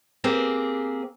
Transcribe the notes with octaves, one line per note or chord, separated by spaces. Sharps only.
A#3 C4 G4 G#4